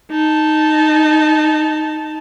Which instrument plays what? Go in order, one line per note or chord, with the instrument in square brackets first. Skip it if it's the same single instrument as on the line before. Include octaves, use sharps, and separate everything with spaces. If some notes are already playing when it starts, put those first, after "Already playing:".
[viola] D#4 A5